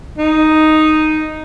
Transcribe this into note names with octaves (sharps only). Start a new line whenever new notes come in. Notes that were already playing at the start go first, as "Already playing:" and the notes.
D#4